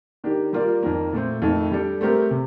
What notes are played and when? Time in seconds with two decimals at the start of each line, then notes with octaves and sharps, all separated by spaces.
0.24 D#3 A#3 D4 G4
0.53 G3 A#3 F4 A#4 D5
0.83 F2 D#3 A#3
1.13 A#2 A3 C4
1.42 F2 D#3 A3
1.71 G3 D4 A4
2.01 A3 C4 G4 A#4
2.31 C3